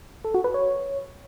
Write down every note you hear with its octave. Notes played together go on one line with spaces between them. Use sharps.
A4
F#4
B4
C#5